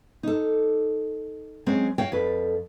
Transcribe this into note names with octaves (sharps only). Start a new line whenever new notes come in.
D#4 A4
F#3 G#3 C4 C#4
F#4 C#5 F5 G5
F2 A4 B4